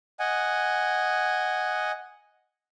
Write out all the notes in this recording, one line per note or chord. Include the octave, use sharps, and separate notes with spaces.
D#5 F#5 G#5